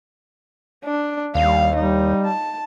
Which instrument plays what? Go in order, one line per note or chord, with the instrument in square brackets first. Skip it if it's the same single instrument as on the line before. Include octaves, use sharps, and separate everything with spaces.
[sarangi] D4
[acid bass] D#2 [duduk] G3 [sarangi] F5
[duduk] G3 [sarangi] D#4
[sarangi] A5